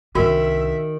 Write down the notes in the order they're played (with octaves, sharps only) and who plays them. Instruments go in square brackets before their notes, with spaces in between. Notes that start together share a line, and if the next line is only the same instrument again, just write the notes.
[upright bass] C2 D4 [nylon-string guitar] D#3 [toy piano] F#4 [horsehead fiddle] E5